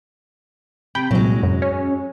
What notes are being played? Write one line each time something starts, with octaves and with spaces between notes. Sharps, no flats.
C3 G5 B5
C2 A#2 F#3 G#3
F#2
C#4